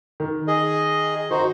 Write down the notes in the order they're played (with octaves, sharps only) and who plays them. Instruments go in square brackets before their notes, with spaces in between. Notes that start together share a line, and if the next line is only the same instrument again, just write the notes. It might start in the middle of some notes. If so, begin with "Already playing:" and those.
[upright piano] D#3
[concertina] G#4 D#5
[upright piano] D#3 D#5 [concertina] D#4 F#4 C5